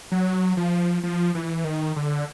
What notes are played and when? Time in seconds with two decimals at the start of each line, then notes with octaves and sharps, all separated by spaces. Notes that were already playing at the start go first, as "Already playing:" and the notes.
0.12 F#3
0.57 F3
1.04 F3
1.35 E3
1.64 D#3
1.96 D3